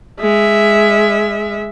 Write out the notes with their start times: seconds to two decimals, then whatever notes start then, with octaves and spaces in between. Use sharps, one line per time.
0.21 G#3 E5